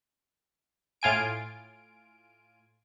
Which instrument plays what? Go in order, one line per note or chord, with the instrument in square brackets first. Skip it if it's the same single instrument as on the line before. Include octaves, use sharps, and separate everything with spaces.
[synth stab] A2 F4 G#5 D7